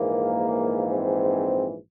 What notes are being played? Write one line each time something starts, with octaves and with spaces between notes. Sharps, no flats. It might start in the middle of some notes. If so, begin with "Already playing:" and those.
Already playing: A#1 G#2 E3 A#3
C4